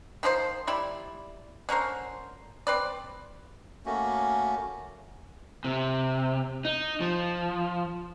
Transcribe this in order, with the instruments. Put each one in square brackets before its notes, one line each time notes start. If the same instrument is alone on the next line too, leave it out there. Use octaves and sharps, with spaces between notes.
[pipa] D#3 F3 D4 C5
G3 E4 D5
D3 C#4 A#4 C5
C4 B4 D5
[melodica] A3 A#3 C#4 F#4
[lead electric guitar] C3
D#4
F3